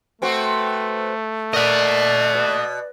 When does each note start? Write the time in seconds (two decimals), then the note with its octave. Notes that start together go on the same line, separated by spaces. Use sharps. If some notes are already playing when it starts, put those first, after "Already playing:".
0.22 A3 B3 C4 F#4
1.53 A#4 D5 D#5 F#5
2.35 B2